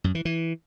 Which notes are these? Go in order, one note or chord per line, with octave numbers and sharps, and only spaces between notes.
F#2
E3
E3